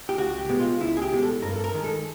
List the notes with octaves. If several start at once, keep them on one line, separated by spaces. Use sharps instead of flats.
G4
C#2 F#4
G4
B2 G#3
F4
C#2 E4
G#4
G4
B2 G#3
A4
G2 A#4
A4
A#4
D#3 G#3
A4